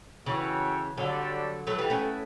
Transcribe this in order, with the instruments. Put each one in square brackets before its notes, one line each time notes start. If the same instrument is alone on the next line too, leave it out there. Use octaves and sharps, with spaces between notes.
[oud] C#3 E3 [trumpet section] F#4 A4 C#5 E5 G5
[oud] D3 F#3 [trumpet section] G3 D4 F#4 A4 D5
[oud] F#3 A3 [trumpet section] B3 E4 B4
[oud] E3 G3
A3 C#4